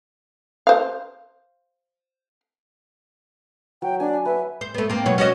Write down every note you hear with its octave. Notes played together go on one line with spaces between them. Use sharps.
C5 F5
F#3 G5
D4 G#5
B4 E5
C5
A3 B3
A#3 C4
B2 F#3 C#5
C#4 F#4 D#5